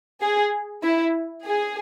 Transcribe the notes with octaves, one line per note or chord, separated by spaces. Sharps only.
G#4
E4
G#4